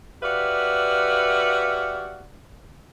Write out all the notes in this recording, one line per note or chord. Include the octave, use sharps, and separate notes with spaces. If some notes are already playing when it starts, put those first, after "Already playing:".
F#4 G4 B4 D5 E5 F5